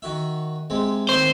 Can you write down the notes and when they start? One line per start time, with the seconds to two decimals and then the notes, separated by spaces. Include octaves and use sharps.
0.02 D#3 F#4 E5
0.70 C3 G#3 C4
1.09 D#2 A2 C4 C5